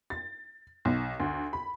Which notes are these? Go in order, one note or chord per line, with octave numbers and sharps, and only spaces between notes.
A6
B1
D2
B5